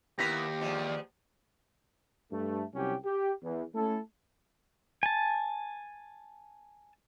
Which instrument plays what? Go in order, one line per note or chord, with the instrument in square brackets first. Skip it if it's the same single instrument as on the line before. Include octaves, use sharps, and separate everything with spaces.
[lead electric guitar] D#2 [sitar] B3 E4 A#4 [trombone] G4 [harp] A#6 B6
[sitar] E2 F3 G#3
[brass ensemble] G2 A3
C2 F#3 C#4 G4 G5
G4
E2
A3 C#4 E4 A4
[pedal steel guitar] G#5 A5